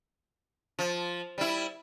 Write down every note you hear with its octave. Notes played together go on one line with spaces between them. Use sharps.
F3
G3 E4